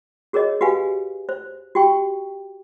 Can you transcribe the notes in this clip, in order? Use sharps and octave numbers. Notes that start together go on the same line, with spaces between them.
F#4 G#4 A#4 C#5 D#5
F#4 G4 B4 F5 G#5
C5
F#4 G4 G5 C#6